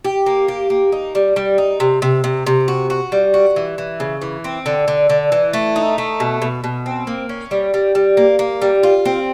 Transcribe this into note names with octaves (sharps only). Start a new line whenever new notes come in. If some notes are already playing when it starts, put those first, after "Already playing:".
G4
A#3
G4
A#3
D#4
G3
G3
D#4
C3
C3
C3
C3
F#4
F#4
G3
F#4
E3
E3
C#3
E3
C4
D3
D3
D3
E3
A3
D#4
A3
B2
B2
B2
C4
A#3
C#4
G3
G3
G3
A#3
A#3
G3
F4
C4